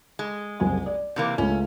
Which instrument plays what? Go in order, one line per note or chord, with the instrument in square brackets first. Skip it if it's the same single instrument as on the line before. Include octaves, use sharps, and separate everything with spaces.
[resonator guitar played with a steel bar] G#3
[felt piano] F#1 C2 G#5
D5
[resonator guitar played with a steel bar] C3 E3 A#3
[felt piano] C#2 A3 [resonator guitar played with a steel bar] C#4